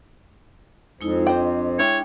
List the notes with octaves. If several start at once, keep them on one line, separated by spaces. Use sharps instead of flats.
F2 G#3 D#4 E4
D4 C5 D#5 G5 C6
G#3 D4 E4 C#5 G5